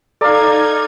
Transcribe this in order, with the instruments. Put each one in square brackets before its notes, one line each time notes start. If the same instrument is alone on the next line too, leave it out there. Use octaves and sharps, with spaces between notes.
[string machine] D#4 G#6 [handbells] A4 A#5 [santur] D5 F5